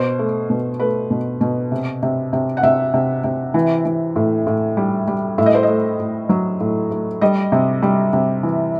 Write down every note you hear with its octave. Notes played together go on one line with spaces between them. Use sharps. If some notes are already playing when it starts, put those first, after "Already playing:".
Already playing: B2 C5
A3
B2
A3 B4
B2
B2
C3
C3
C3
F#5
C3 E5
C3
C3
E3
E3
A2
A2
G3
G3
A2 E5
D#5
C5
D#5
A3
A2
F#3
A2
A3
G3 D#5
C3
G3
C3
E3